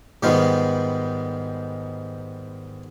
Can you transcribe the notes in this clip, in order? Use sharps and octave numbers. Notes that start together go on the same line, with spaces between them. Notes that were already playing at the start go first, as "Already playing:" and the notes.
G#2 D#3 G3 G#3 B3 F4